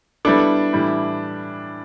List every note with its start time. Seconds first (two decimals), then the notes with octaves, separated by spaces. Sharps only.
0.25 G3 B3 D4 E4 A4
0.73 A2 E3 G3 E4